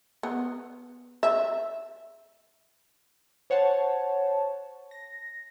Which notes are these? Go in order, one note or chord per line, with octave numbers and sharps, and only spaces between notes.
B3
E5
C5 C#5 F#5 A5
A#6